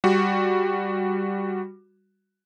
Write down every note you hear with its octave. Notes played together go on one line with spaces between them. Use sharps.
G3 F#4